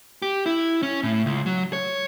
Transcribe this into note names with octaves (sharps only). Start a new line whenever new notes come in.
G4
E4
C#4
A2
C#2
F#3
C#5